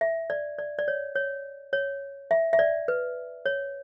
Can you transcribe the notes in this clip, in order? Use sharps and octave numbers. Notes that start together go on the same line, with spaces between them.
E5
D5
D5
D5
C#5
C#5
C#5
E5
E5
D5
B4
C#5